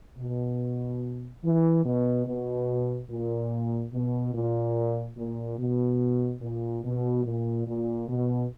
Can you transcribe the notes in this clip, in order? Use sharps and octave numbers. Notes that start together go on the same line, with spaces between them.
B2
E3
B2
B2
A#2
B2
A#2
A#2
B2
A#2
B2
A#2
A#2
B2